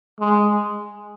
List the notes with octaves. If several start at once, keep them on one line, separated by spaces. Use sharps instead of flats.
G#3